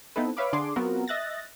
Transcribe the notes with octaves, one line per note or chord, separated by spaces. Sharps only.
B3 C4 D#4 E4 A4 B4
B4 C#5 E5 F5 B5 D6
D3 D4 G#4 C6 D6
F#3 B3 C4 F4 F#4 A#4
D#5 E5 F#6 A6 A#6